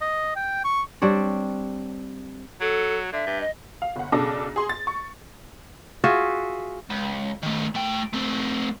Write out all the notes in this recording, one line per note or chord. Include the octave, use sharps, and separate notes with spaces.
D#5
G5
C#6
G3 C4 D4 C#5
F#3 A4
D3 E5
G2
D#5
F5
G1 F#5
B1 C#3 D4 A4 A#6
G#4 C6
A6
C#6
F4 F#4 G#4 E5
C#2
D#3 A3
A3 G5
A3 C4